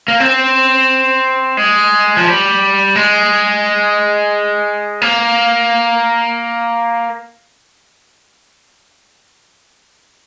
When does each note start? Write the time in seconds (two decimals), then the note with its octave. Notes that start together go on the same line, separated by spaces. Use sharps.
0.08 A#3
0.20 C4
1.57 G#3
2.17 F3
2.26 G3
2.95 G#3
5.02 A#3